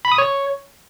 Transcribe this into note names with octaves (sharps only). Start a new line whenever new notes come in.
B5
D#6
C#5